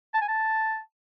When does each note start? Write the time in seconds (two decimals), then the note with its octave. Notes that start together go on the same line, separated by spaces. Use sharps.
0.14 A5
0.22 G#5
0.28 A5